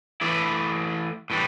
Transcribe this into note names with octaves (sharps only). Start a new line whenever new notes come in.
E3 A3 E4 B4 D5
A2 E3 G3